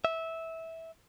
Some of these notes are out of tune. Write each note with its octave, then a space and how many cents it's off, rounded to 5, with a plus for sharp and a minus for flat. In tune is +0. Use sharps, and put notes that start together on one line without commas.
E5 -15